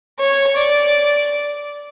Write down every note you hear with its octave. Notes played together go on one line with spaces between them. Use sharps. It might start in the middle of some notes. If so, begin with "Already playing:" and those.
C#5
D5